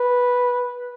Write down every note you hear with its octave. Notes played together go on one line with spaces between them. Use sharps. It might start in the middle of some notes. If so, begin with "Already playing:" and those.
Already playing: B4